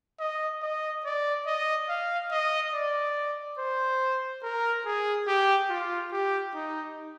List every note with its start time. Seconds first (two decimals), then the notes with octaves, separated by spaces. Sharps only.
0.20 D#5
0.62 D#5
1.05 D5
1.47 D#5
1.89 F5
2.31 D#5
2.73 D5
3.58 C5
4.43 A#4
4.85 G#4
5.27 G4
5.69 F4
6.12 G4
6.54 D#4